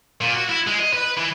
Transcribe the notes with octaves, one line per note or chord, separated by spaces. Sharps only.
A#2
F#4
E4
G#3
D#5
B4
E3